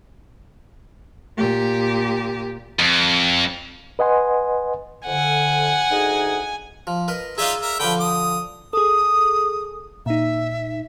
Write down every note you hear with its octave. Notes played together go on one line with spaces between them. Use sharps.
A#2 G4
F2
B4 D#5 F#5 G#5 C6
F2 D3 F#5 G#5
D2 D#4 G#4
F3
A#4 B4 D#5
D#4 F4 G#4 D5 E5 F5
A#4 E5
D3 F3 B4 G5
D#6
G#4 A4 D#6
A#2 D#4 E5